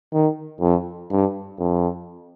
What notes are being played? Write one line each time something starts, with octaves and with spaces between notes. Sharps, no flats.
D#3
F2
G2
F2